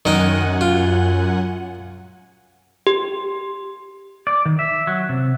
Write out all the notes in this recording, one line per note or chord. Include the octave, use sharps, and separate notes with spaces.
F#2 D#3 D#4 F#5 G#5
F4
G4
D5
D#3
E5
F#3
C3